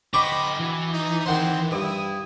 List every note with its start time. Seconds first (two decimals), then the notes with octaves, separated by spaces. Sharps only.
0.14 D3 C5 D#5 F#5 G5 B5 C#6 D6
0.60 E3 B3 E4 F#4
0.93 D#4
1.26 D#3 G#3 C4 C5 F#5 C6
1.71 G2 E4 D#6